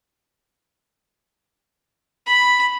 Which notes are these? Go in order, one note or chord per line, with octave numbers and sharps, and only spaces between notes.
B5